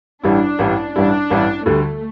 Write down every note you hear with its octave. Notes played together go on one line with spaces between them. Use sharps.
A1 G2 G3 D4 E4
A1 G2 G3 E4
A1 G2 G3 D4 E4
A1 G2 G3 E4
D2 D3 G3 A3